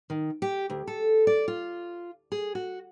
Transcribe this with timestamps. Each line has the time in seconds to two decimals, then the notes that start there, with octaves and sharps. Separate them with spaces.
0.10 D#3
0.42 G4
0.70 D2
0.87 A4
1.27 D5
1.48 F4
2.32 G#4
2.55 F#4